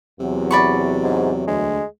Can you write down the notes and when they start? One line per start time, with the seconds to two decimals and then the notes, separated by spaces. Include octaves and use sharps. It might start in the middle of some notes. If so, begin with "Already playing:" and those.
0.20 E2 C3 F#3
0.51 D5 B5 C#6
1.04 G#2
1.47 D2 G#3